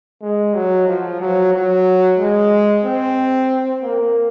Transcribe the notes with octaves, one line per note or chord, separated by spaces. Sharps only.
G#3
F#3
F3
F#3
F#3
G#3
C4
A#3